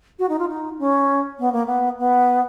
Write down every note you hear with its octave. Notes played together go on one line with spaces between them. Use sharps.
F#4
D#4
F4
D#4
C#4
B3
A#3
B3
B3